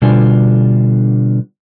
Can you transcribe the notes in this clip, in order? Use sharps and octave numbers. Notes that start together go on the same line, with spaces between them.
B2 D3 G3 D4 F4 G#5